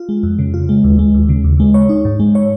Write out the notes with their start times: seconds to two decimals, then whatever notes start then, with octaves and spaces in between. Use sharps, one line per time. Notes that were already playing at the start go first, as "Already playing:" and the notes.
Already playing: F4
0.09 G#3
0.23 F2
0.39 C#3
0.54 F4
0.69 G#3
0.84 D#2
0.99 G#3
1.14 D#2
1.29 C#3
1.44 D#2
1.60 G#3
1.74 C#5
1.89 D#4
2.05 G#2
2.20 G#3
2.35 C#5